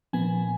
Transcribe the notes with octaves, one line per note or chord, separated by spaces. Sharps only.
A#2 F3 B3 G#5